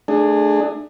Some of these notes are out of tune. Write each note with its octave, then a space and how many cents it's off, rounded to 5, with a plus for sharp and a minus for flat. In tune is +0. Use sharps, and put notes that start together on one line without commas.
A3 +0 D4 +25 G#4 +0